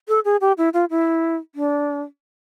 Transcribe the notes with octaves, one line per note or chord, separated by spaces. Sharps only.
A4
G#4
G4
E4
F4
E4
D4